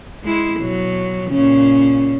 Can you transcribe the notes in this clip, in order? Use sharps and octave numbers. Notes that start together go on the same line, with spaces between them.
G#3 E4
B2 F#3
A#2 C#3 C#4